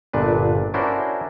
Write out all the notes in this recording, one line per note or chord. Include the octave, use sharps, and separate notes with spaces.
G1 A#2 D4 B4
C#4 D4 E4 F#4 A#4 C5